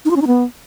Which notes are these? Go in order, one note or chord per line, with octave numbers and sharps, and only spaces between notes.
D#4
F4
C#4
D#4
B3